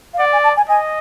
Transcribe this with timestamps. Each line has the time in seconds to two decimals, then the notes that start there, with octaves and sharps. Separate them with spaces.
0.14 F5
0.19 D5 F#5
0.33 G#5
0.44 A5
0.57 G#5
0.69 D#5 G#5